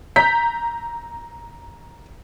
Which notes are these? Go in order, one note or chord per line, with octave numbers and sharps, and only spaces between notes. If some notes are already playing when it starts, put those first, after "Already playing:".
A#5 G6 B6